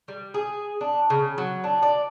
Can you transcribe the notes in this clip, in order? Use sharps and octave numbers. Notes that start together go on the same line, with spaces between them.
G3
G#4
D4
C#3
F#3
D4
D5